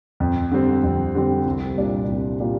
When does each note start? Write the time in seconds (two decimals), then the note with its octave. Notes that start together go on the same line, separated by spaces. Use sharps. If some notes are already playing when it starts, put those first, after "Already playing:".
0.20 F2
0.52 D3 G3 C4
0.84 F2
1.15 D3 G3 C4
1.46 C2
1.77 A#2 G3 D4 F4
2.08 C2
2.40 A#2 G3 D4 F4